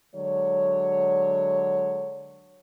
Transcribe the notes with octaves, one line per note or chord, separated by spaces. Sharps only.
D3 F#3 G#3 C#5